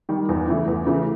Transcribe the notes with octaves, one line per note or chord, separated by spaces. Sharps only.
D#3 G3
E2
C#3 E3 A3
E2
C#3 E3 A3